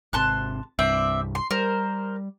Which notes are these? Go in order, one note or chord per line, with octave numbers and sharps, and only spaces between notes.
G#1 C3 A5 C6 F#6
C2 G2 C4 D5 E5
C6
G3 A#4 C5